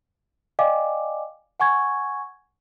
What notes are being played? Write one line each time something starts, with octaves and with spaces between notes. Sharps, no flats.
D5 D#5 F5 G5 G#5 D6
F#5 G#5 C#6 G#6